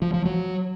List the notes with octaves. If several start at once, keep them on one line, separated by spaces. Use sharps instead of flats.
F3
F3
F#3